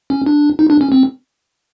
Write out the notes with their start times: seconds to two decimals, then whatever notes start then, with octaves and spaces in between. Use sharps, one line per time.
0.10 C#4
0.26 D4
0.59 D#4
0.70 D4
0.81 C#4
0.92 C4